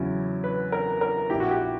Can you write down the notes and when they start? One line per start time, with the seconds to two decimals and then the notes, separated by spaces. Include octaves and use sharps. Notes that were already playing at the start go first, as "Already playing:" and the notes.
Already playing: E2 C#3 F#3 C#4 E4
0.44 B4
0.72 A#4
1.01 A#4
1.30 A#1 A#2 A#3 E4 G4
1.40 F#4
1.51 G4